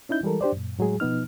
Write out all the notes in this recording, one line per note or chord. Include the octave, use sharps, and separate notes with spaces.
C#4 D#4 E4 G6
E3 G3 G#3 A4 A#4
D4 G4 C5 D5
F#2 A#2
A2 F#3 G#3 G#4
B2 F3 B3 D#4 F6